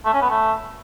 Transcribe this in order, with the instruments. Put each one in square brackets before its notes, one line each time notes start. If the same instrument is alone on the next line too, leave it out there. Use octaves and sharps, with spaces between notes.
[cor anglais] A3
C#4
B3
A3